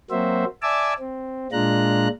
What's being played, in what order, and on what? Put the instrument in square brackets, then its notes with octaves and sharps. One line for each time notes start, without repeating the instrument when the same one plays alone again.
[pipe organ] F#3 A#3 C4 F#4 C5 E5
D5 E5 G#5 A5 D6 E6
C4
A#2 G#3 D4 F4 A#5 F#6